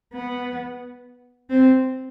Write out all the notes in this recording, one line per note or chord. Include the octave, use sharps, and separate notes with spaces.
B3
C4